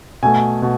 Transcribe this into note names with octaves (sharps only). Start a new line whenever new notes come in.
B2 A3 G#5
B2